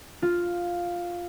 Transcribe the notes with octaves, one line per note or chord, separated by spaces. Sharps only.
F4